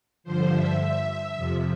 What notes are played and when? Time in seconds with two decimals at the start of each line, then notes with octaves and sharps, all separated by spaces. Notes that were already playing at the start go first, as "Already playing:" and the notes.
0.24 G2 D3 F3 C5
0.53 E5
0.80 E5
1.36 F2 C3 F3